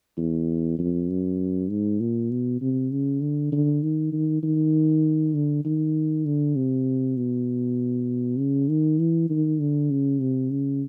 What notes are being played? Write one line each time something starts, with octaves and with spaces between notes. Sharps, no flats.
E2
F2
F#2
G#2
A#2
B2
C3
C#3
D3
D3
D#3
D#3
D#3
D3
D#3
D3
C3
B2
C#3
D#3
E3
D#3
D3
C#3
C3
C#3